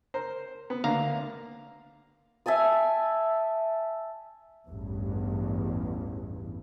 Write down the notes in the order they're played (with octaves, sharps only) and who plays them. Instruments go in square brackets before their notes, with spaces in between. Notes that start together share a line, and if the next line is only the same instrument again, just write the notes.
[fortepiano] A#4 C5 A#5
B3
[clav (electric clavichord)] D2 F5 A#5 [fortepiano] D3 A#3
[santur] E5 G#5 A5 D#6
[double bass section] A1 E2 G2